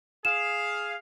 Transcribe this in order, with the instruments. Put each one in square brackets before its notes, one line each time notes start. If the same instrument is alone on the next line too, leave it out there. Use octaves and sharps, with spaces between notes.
[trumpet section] G#4 F5 [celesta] E7